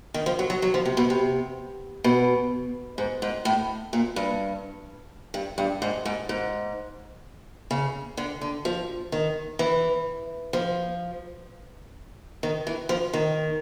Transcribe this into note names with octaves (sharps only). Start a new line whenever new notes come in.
D#3
F3
F#3
F#3
F#3
F3
C3
B2
C3
B2
G#2
G#2
A2
A#2
G2
G2
G2
G#2
G#2
G#2
C#3
D3
D3
F3
D#3
E3
F3
D#3
E3
F3
D#3